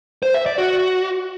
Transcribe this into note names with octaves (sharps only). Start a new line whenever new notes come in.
C5
E5
D5
F#4